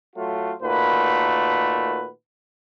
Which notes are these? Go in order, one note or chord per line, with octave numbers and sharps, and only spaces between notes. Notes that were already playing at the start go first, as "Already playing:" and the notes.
F#3 A3 F4 F#4
A#2 D#3 A3 F#4 B4